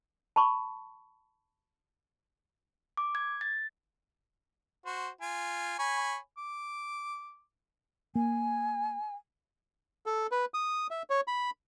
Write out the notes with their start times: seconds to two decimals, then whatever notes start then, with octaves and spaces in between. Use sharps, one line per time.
0.36 A5 B5 C#6
2.97 D6
3.15 G#6
3.41 A6
4.86 F#4 C5
5.21 F4 G#5
5.79 C#5 G#5 B5
6.38 D6
8.15 A#3 G#5
10.06 A4
10.32 B4
10.54 D#6
10.91 E5
11.10 C#5
11.28 B5